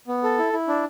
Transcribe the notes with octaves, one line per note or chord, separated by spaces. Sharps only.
B3
A4
E4
E4
D4